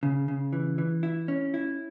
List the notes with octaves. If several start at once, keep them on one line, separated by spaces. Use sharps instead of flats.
C#3
C#3
E3
E3
E4
C#4
E4